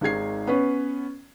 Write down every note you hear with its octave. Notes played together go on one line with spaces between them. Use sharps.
G#1 D#3 G#3 G#6 C7
B3 C#4 B4 C#5